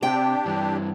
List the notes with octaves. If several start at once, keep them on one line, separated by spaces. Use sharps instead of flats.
C3 D4 G4 G5
G2 E3